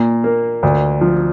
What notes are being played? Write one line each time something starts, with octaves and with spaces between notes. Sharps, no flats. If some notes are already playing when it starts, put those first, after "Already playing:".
Already playing: A#2
A#3
D2
F3